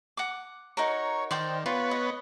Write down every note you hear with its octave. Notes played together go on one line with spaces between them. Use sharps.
F#5 D6
D#4 F#4 A#4 C#5
D#3 C5 D5 G5
B3 F4 B4 C#5
D#5